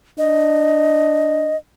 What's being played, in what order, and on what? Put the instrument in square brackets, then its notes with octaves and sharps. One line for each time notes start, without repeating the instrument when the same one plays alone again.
[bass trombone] D4 [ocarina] D#5